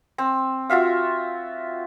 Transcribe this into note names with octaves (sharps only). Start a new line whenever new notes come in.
C4
F4 F#4 E5 F5